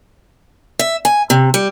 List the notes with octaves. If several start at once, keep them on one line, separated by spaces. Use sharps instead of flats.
E5
G#5
C3
G3